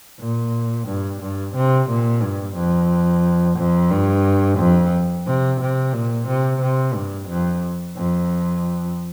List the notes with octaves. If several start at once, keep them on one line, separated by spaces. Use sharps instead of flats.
A#2
G2
G2
C3
A#2
G2
F2
F2
G2
F2
C3
C3
A#2
C3
C3
G2
F2
F2